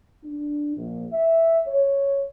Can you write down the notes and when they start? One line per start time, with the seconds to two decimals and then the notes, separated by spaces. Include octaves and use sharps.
0.24 D4
0.77 A#1
1.13 E5
1.66 C#5